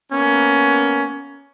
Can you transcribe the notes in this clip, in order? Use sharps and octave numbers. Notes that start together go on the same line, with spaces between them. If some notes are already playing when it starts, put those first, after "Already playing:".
A#3 B3 C#4